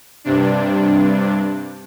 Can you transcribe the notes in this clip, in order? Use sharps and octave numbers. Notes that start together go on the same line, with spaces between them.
G2 C3 D4